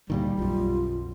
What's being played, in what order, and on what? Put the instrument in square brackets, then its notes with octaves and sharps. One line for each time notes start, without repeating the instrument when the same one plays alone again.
[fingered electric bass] D2 A#2 D#3 [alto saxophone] G3
[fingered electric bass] B1 F#2 [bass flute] F4